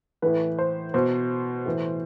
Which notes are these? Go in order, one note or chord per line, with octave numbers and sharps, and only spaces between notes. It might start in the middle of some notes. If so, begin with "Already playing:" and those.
A2 E3 B4
C5
B2 C5
A2 E3